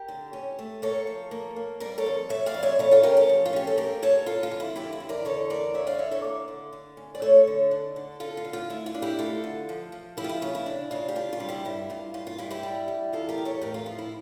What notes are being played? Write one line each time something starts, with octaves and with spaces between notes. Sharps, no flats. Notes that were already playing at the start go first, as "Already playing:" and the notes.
Already playing: G4 A#4
D3
C#4
A3
A#3 A4 C#5
F3
A#3
A#3
G3 A#4 D5
A4 C#5
F2
F2 C#5 E5
D5 F5
F2
C#5 E5
C#3 A4 C#5
F4 A4
C#4 G4 A#4
A4 C#5
F3
F4
C#4 G4
A4
A#3 G4 A#4
A#3 A4 C#5
D3 F4 A4
F4
F2
E4
D3 E4 G4
E4
E2
A#4 D5
D3 A4 C#5
E2 A#4 D5
D3 C#5 E5
D5 F5
D3 C#5 E5
A4 C#5
A#3
D3
D3
C#4
D5
A3 A4 C#5
D3
D4
D3
D3 F4 A4
F4
D3
F4
A3 E4
F4
D4
E4 G4
A3 F4 A4
D3
F3
F3
F3 E4 G4
F4
E4
C#3 F4
E4
D4
C#3 F4
G4
D4 F4
F4
G3
E4 G4
G2 E4
G2 F4
G2 F4
F4
G2 E4 G4
E4 G4
G3
G3
E2 F4 A4
G4 A#4
E2
A4 C#5
A2 G4 A#4
F4 A4
F3 F4
E4